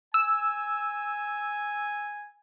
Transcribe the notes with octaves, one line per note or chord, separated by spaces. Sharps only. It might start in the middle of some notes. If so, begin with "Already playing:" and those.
G#5 E6